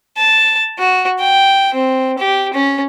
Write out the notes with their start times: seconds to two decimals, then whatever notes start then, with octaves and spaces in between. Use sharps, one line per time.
0.17 A5
0.78 F#4
1.19 G5
1.74 C4
2.18 G4
2.54 C#4